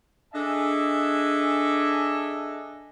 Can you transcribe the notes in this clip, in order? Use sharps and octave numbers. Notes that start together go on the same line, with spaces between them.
D4 G#4 A4 D#5 E5 G#5